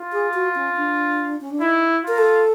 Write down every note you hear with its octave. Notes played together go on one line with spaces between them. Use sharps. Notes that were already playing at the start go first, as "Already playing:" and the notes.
Already playing: F4
G#4
F#4
C#4
D4
C#4
D4
D#4 E4
F4 A#4
A4